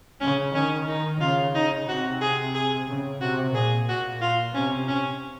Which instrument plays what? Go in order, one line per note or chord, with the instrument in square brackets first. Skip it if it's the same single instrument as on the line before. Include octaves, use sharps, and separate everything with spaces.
[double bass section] C#3 [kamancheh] C#4
[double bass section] D#3 [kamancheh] C#4
[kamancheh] D#4
[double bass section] C#3 [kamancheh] F4
[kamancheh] D#4
[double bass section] C3 [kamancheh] F#4
[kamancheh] G#4
G#4
[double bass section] C#3
[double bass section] C3 [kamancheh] F#4
[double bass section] A#2 [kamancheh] G#4
[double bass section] A#2 [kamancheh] F#4
[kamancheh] F4
[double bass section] C3 [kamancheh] C#4
[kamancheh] C#4